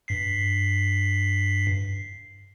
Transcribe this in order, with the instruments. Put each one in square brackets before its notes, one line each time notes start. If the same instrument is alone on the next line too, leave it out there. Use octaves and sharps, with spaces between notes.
[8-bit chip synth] G2 B6 C7